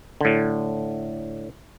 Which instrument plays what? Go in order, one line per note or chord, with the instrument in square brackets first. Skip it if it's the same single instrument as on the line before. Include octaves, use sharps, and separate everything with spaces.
[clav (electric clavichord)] A2 D3